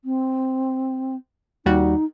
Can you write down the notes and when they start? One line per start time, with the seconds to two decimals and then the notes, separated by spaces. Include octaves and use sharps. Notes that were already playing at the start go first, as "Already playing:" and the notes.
0.05 C4
1.66 D#2 G3 D#4 F#4